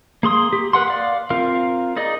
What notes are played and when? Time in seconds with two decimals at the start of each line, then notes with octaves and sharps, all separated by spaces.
0.23 A#3 G#4 C6 D#6
0.53 G4
0.73 A#4 B4 F#5 C6
0.88 D5 F5
1.30 C4 F4 A#4 F5
1.97 D#4 G#4 D5 D#5